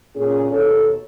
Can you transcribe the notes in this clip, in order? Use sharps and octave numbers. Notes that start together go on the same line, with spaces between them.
A#2 C#4 G#4
D#2 B2 A4 C#5